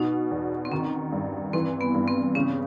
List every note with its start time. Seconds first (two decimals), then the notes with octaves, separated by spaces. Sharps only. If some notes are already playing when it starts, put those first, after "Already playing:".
Already playing: B2 D#4
0.31 E2
0.65 C4
0.72 D#3 C#4
1.12 G2
1.53 E3 C4
1.81 B3
1.95 G2
2.08 C4
2.35 C#3 C#4